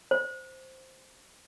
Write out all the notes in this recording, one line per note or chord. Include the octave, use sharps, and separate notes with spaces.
C5